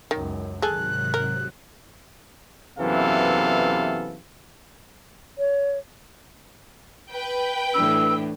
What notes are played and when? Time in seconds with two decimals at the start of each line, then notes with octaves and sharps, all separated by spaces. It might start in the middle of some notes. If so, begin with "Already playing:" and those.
0.11 C#2 F#2 D#3
0.62 G#2 C3 D#3 F#3 G#4 A4 F#6
1.14 A#4
2.78 F#2 C3 E3 B3 A4 F5
5.38 C#5
7.11 B4 G5
7.74 A2 E3 D4 E6